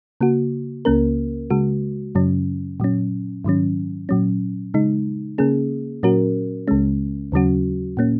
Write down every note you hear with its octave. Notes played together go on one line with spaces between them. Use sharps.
C#3 A#3 F#4
C#2 C#3 A#3 C#4 A#4
C#3 G#3 F#4
F#2 C#3 F#3 C#4
A#2 F#3 C#4
G#2 D#3 F#3 C#4
A#2 F#3 C#4
C#3 G#3 D#4
C#3 A#3 C#4 G#4
A#2 F#3 C#4 F#4 A#4
C#2 C#3 G#3 C#4
D#2 C#3 F#3 C#4 F#4
A#2 A#3 C#4